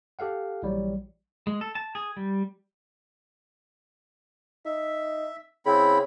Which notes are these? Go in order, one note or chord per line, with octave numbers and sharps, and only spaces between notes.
G4 A4 F5 F#5
A#1 E3 F#3 G3
G#3
A4
A5
G#4
G3
D#4 E5
C#3 C4 E4 B5